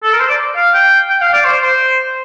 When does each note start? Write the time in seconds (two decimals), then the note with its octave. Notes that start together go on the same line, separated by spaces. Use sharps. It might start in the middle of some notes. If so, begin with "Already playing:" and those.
0.03 A4
0.12 A#4
0.20 C5
0.29 D5
0.56 F5
0.74 G5
1.09 G5
1.21 F5
1.33 D5
1.45 C5
1.62 C5